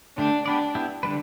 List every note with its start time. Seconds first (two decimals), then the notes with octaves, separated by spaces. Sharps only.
0.18 D3 A3 D4 G4
0.46 B3 D4 G4 B4 D5
0.75 B3 E4 G4
1.03 D3 G3 D4 B4